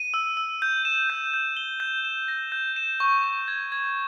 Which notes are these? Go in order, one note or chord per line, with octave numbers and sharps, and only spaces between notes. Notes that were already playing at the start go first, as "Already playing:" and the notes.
Already playing: D#7
E6
E6
G6
E7
G6
G6
G7
G6
E7
A#6
G6
E7
C#6
C#6
G#6
G#6